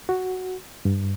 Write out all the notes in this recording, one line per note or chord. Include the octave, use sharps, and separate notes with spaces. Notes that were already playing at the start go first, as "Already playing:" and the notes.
F#4
G2